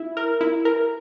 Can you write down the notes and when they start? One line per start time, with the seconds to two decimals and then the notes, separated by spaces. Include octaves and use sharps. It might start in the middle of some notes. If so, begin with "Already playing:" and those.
Already playing: E4
0.17 A#4
0.41 E4
0.65 A#4